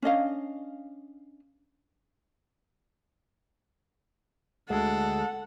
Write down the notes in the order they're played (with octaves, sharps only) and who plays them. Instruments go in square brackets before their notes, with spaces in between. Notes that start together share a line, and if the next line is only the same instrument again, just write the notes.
[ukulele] C#4 D4 D#5 F5
[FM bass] D2 [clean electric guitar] G#3 [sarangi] A4 [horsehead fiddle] F#5